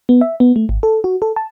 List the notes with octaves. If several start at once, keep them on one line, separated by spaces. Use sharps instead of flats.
B3
E5
B3
A3
G#1
A4
F#4
A4
A5